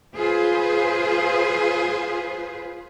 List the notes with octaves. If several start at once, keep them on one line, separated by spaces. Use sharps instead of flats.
F4 G#4 B4 C5